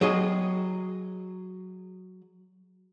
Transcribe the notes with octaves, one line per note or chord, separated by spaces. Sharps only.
F#3 G#4 D#5